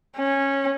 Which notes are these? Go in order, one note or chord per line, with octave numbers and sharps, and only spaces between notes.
C#4